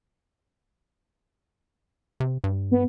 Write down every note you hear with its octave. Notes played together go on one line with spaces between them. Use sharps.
C3
G2
B3